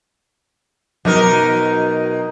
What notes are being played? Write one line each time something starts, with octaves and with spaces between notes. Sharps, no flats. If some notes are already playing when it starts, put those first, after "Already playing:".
B2 F#3 D#4 A#4